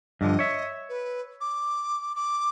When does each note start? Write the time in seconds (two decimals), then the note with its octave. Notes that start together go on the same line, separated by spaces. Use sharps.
0.21 G2 D3 F3 D#5
0.39 C#5 E5
0.89 B4
1.41 D6
2.15 D6